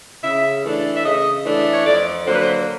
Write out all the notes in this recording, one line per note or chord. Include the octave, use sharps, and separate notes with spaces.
C#3 E5
E3 A3 D4
E5
C#3 D#5
E3 A3 D4
C#5
F2 D5
D3 F#3 A#3 C5
B4
C5